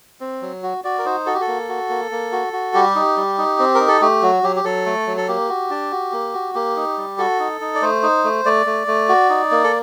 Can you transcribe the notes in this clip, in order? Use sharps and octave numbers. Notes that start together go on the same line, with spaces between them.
C4
F#3
F#4
F#4 D5
A#4
D#4 C5
F#4 A4
G4
A4
A#3
F#4
A#3
A#3
F#4
F#4
G3 G4
D#4
G3
D#4
C4
D#4 A#4
A4
A3 G4
F#3 F#4
F#3 G4
G4
F#3 A4
A3
F#3
A4
A#3 G4
F#4
D4
F#4
A#3
F#4
A#3 G4
D#4
G3
F#4 A4
D#4
D#4
D5
A3 C5
D#4
A3
A3 D5
A3
A3
F#4
D#4
A#3
A4